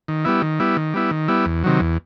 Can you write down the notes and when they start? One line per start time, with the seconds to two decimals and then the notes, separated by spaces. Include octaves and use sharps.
0.08 D#3
0.25 G3 B3 E4
0.42 D#3
0.59 G3 B3 E4
0.77 D#3
0.94 G3 B3 E4
1.11 D#3
1.28 G3 B3 E4
1.46 E2
1.64 C3 D#3 F#3
1.80 E2